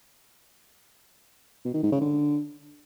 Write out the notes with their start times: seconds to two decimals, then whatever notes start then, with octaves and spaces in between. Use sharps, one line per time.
1.65 B2
1.74 D#3
1.83 G#2
1.92 C#3
2.01 D3